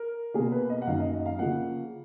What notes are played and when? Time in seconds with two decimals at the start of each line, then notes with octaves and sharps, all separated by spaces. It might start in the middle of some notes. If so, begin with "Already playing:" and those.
Already playing: A#4
0.34 B2 A#3 G#4
0.52 B4
0.70 D#5
0.82 F#5
0.87 F#2 D#3 A#3 F5
1.00 D#5
1.13 D#5
1.26 F5
1.39 C#3 F3 A#3 F#5